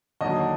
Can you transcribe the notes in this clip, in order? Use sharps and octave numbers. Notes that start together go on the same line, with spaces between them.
D#2 D3 F#3 D#5